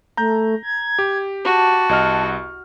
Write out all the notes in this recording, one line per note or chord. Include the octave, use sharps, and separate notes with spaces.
A3 A#5 G6
G#6
G4
F#4 A5
C2 D#5 F6